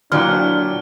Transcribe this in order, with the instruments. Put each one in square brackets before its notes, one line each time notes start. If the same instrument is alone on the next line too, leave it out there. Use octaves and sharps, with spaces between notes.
[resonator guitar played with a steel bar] A#2 F#3 [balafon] D3 E4 G5 [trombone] D4 [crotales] F6